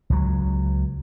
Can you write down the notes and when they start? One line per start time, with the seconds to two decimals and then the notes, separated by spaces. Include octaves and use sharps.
0.10 C#2 F#3